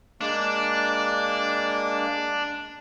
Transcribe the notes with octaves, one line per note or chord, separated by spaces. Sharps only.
G#3 A#3 D4